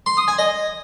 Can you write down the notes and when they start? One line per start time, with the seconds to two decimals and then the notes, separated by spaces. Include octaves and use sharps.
0.06 C6
0.17 D#6
0.28 G#5
0.39 D#5